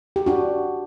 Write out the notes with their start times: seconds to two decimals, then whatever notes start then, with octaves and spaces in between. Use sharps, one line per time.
0.16 G4
0.26 D4 F#4